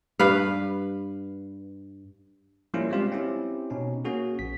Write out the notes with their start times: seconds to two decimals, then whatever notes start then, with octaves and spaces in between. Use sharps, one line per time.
0.20 G2 B4 F5
2.74 F3 G3 A#3 C#4 E4 F4
2.90 G3 G#3 C4 F4 G4 F5
3.12 C4 C#4 E4 G4
3.70 B2 C#4 D#4
4.05 A#3 C#4 F#4 G#4
4.39 A#1 B6